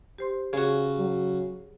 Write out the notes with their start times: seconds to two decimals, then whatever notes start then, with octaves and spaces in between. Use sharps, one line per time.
0.18 G4 C5 C6
0.53 C#3 F#4 G#4 C#5
0.99 F#3